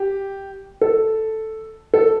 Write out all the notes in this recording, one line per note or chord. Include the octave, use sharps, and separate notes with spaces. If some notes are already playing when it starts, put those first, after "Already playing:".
Already playing: G4
A4
A4